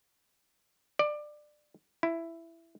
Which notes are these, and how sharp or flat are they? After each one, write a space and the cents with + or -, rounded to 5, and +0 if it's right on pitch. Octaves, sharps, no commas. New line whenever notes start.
D5 +20
E4 +10